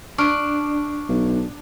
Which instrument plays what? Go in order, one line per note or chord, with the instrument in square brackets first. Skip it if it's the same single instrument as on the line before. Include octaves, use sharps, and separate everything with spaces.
[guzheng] D4 [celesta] C#6 F6 D7
[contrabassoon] B1